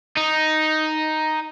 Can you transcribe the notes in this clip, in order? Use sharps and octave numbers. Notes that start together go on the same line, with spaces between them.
D#4